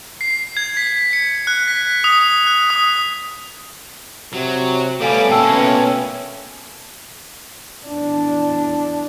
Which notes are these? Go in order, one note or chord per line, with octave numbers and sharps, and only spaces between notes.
C7
G#6
B6
C#7
F#6
B6
D#6
F#6
D#6
C3 F#3
G3 A3 B3 A4 C#5 F5 G#5 D6
B2 A#3 B3 C#4 G5 A5 E6
E2 D4